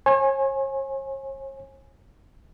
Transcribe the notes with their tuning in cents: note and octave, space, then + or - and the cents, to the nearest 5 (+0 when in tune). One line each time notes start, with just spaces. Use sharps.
C#5 -45 G#5 +0